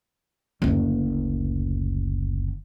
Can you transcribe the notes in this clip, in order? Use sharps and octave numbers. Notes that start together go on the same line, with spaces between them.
F#1 D2